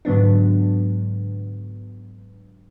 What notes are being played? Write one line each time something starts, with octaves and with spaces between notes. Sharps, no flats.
G#2 D3 F#3 B3 D4